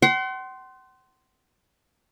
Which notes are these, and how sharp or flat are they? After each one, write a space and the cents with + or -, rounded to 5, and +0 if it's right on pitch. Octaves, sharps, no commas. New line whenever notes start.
F#5 +45 C6 +0